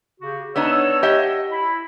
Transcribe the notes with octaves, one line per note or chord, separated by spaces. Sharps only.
C#3 F#4 G4
B3 D4 D#4 C#5 E6
G4 D#5 F#5
E4 B5